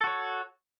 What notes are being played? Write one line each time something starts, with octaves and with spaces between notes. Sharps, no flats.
F#4 A4 C#5